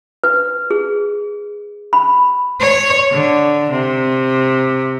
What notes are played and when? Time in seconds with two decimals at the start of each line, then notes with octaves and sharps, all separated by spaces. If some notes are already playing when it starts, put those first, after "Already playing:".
0.24 B4
0.71 G#4
1.93 B5
2.60 C#5
3.12 D3
3.71 C3